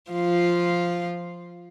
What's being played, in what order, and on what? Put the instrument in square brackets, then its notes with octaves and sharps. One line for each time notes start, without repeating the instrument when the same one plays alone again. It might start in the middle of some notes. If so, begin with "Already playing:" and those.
[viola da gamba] F3 F4